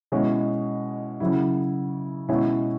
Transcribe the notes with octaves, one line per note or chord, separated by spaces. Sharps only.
B2 G#3 C#4 E4
C#3 F#3 E4
B2 G#3 C#4 E4